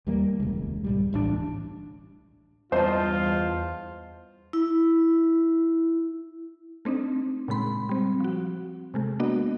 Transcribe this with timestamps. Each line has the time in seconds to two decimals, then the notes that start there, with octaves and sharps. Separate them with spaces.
0.07 D#2 G3 A#3
0.40 E1 C#2
0.84 B1 G#2 G3
1.13 D1 A1 G2 D4
2.72 E2 G2 F4 C5 D#5 A5
4.53 E4
6.85 A3 C4 D4 D#4
7.48 A#2 C#3 G#3 B5 C6
7.89 G3 C4
8.20 F3 F#4
8.94 C3 G#3 A3
9.20 A#3 B3 D4 F#4 D#5